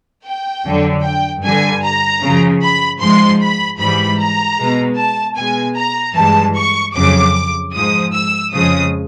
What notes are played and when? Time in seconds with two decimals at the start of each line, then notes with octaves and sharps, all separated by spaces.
0.26 G5
0.65 F2 D3 F#3
1.04 G5
1.44 G2 D3 G3 G#5
1.83 A#5
2.22 F#2 C#3 F3
2.62 B5
3.02 G#2 F3 G#3 C6
3.41 B5
3.80 G#2 E3 G3 B5
4.20 A#5
4.59 B2 G#3
4.98 A5
5.37 B2 G#3 G#5
5.77 A#5
6.16 G2 E3 G#3 A5
6.56 C#6
6.95 F2 C#3 F#3 D6
7.74 G#2 F3 G#3 D#6
8.13 E6
8.52 F2 C#3 F3 G#3 D#6